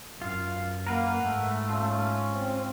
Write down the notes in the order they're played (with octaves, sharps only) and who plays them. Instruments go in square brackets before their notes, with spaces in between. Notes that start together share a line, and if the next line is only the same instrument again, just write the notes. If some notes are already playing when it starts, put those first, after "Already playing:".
[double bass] F#2 [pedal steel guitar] F4 F5
[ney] A#3 [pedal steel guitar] A#4 B4 F5 [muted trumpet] F#5
[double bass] G#2 [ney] A3
[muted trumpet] C#4 [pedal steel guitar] F4
[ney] C4